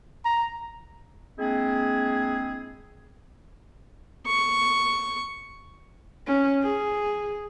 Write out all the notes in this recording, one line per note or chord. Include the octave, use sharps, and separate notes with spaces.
A#5
G#3 A#3 C4 D4 E4 G#4
C#6
C#4
G#4